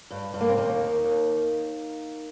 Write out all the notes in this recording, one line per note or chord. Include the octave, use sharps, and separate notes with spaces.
G2
G2
A#3
C4
D#2 A#3 D#4
D#3
D#2